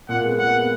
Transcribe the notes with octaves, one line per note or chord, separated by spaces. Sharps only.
A#2 F#5
G#3 B3
A#2 F#5
G#3 B3